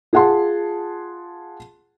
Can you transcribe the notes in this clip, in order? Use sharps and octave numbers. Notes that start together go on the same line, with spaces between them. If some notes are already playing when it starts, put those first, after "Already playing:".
F4 G#4 F#5 A5 C6